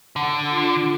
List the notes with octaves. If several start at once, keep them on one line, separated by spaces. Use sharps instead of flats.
D3 F#5 A5
F4 F#5